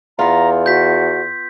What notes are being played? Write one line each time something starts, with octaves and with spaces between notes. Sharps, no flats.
E2 B3 F4 A#5
F#4 G6 B6